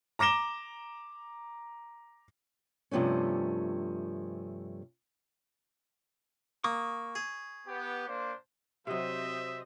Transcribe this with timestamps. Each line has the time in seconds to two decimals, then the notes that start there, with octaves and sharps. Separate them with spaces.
0.19 A#5 D6 A#6 E7 G7
2.91 G2 C3 F3 A3 C#4
6.64 A#3 C#6 D#6
7.15 G#4
7.67 B3 G4
8.08 A#3 D4 C5
8.87 C3 F#3 C4 C5 D#5 E5